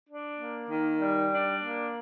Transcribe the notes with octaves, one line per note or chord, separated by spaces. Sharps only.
D4
A#3
D#3
G3
D4
A#3